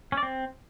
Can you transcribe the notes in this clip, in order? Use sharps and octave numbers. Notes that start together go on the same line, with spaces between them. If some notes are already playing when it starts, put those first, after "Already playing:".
C#4
D5
C4